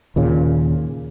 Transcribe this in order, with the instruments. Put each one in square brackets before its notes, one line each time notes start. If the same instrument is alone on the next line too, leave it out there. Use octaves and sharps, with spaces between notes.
[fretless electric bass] D#2 A#2 C#3